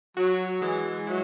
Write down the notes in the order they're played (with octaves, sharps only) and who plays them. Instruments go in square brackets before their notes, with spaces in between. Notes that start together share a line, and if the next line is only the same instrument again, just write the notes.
[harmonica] F#3 [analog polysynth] F#4
[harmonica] E3 [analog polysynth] G#3
[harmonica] F#3 [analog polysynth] E4